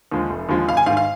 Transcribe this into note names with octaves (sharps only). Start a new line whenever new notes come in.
D#2 D3 F3 G#3
F1
D#2 D3 F3 G#3
G#1 F5
G#5
G#2 D#3 F5
F5